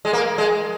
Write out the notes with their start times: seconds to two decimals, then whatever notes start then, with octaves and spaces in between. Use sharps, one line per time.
0.05 G#3
0.13 A#3
0.38 G#3